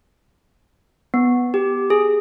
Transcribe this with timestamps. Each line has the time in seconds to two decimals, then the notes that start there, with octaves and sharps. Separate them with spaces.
1.14 B3
1.54 G4
1.90 G#4